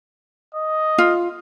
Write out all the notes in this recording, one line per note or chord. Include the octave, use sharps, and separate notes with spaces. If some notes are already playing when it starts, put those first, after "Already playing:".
D#5
F4